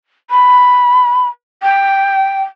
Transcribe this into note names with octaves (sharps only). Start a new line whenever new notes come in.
B5
G5